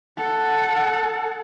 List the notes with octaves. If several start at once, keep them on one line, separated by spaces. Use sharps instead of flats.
A4 F#5